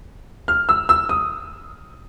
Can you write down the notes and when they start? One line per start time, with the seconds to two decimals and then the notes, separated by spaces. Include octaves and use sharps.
0.48 F6
0.69 E6
0.89 E6
1.09 D#6